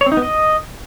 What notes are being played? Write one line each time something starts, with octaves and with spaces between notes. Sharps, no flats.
C#5
C4
D#4
B3
D#5